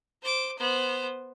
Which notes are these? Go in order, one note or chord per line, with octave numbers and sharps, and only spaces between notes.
C5 D6
B3 C5